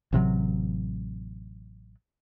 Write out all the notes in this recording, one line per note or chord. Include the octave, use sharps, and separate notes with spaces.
A1 C3 D#3 F#3